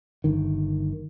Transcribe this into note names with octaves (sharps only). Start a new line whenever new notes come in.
G1 D#3